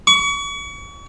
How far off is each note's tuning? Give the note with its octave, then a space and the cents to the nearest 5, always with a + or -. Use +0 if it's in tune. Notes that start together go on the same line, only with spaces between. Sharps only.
C#6 +35